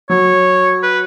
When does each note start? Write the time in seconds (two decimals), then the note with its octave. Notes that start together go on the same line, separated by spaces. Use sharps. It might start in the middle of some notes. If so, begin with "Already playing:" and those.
0.10 F#3 C#5
0.83 B4